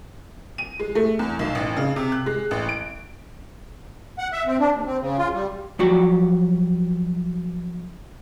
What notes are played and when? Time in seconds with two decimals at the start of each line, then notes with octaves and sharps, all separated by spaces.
0.58 D#7
0.80 G#3
0.95 A3
1.19 E2
1.39 B1
1.55 A1
1.77 C#3
1.96 C3
2.12 F#6
2.26 G#3
2.51 A1
2.69 D7
4.18 F#5
4.32 E5
4.47 C4
4.60 D4
4.72 D#2
4.86 C4
5.00 C#3
5.18 F4
5.33 G3
5.79 F3 F#3 F#4 G4